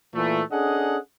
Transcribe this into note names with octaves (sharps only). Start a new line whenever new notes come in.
A#2 E3 A3
C#4 D4 G#4 A4 D#5 F#5